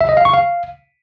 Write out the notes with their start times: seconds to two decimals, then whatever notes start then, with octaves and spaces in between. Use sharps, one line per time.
0.01 E5
0.09 D#5
0.17 F5
0.25 C#6
0.33 F5